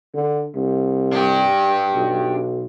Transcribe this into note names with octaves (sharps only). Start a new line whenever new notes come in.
D3
C2
D4 G4
B1